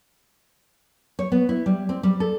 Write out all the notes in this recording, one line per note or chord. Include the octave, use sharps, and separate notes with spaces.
C#5
B3
E4
G3
C4
G3
A4